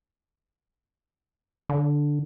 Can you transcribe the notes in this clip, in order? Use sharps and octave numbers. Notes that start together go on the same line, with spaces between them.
D3